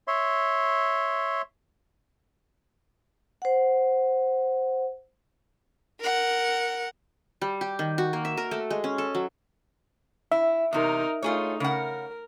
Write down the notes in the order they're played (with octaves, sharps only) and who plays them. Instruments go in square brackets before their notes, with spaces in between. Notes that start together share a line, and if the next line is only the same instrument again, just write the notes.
[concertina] C#5 E5 C6
[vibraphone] C5 F#5
[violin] A#4 F#5
[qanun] G3
G4
D#3
F#4
A#3
E5
A#4
A3
G#3
C#4
A4
F#3
[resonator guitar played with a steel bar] E4 [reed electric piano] E5
[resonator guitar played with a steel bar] E2 C3 [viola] D#4 A#4
[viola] A3 D#4 [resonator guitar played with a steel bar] F4 G#4 C#5
[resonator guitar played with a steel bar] C#3 F#5 [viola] A#4